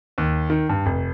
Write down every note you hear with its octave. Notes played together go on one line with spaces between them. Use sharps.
D#2
D#3
G2
F1